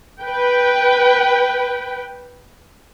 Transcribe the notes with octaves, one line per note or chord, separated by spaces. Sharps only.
B4 G5